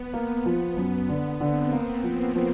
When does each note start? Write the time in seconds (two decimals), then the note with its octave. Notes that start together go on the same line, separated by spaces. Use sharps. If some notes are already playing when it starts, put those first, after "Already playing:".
Already playing: B3
0.14 A#3
0.46 F3
0.77 F#2
1.09 D3 B3
1.41 D3 C4
1.72 A#3 B3
2.04 F3 A#3
2.35 F3